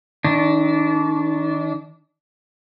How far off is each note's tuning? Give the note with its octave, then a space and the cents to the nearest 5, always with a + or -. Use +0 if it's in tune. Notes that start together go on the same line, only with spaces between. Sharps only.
D#3 +20 D4 -25